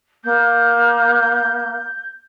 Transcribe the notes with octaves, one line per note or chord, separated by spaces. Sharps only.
A#3 G6